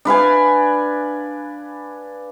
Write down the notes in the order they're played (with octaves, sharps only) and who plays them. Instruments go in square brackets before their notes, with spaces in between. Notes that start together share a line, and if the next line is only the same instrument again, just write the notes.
[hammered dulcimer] D4 B4 F5 G#5